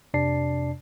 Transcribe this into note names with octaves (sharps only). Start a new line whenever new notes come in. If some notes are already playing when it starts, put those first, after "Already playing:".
F2 C3 D4 D5 A5 C7